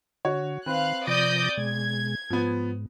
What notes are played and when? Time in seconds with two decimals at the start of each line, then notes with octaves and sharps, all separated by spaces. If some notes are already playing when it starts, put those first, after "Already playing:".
0.25 D3 F#4 C#5
0.66 D#3 C4 B4 F5 F#6
1.07 C3 F3 D5 D#6 G6 A#6
1.57 B2 G#3 G#6
2.30 G#2 F3 B3